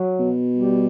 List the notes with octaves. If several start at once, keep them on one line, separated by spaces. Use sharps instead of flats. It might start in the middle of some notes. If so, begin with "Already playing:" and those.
Already playing: F#3
B2
G3